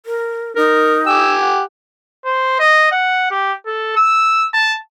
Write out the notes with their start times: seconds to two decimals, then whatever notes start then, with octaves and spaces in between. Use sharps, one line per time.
0.06 A#4
0.56 D#4 A#4
1.07 G4 G#5 E6
1.42 F#5
2.25 C5
2.60 D#5
2.92 F#5
3.31 G4
3.66 A4
3.96 E6
4.54 A5